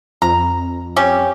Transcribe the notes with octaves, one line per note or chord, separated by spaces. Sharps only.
F2 A#5
G3 C#4 G4